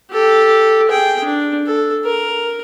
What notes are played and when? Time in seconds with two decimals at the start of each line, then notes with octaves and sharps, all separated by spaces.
0.12 G4 A4
0.89 G#4 G5
1.24 D4
1.67 A4
2.05 A#4